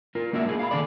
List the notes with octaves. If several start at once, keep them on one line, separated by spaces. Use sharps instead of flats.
F4 A#4
A#3 D4 F#4 D5 E5
A#3 F4 G#4
F5 G5 B5
D3 D#3 D4 G#4 A4 D5